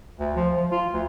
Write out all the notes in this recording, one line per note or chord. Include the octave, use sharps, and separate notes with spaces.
D2
F3
F3
F4
D2